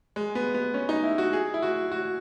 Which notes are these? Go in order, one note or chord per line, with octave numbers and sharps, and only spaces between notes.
G#3
B3
B3
C#4
D#4
E4
F#4
G#4
E4
F#4
F#4